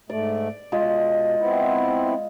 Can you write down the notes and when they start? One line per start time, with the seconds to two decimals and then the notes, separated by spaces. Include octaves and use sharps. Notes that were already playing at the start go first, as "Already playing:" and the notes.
0.10 G#2 A3 D5
0.72 B2 G#3 F4
1.39 B3 C4 E4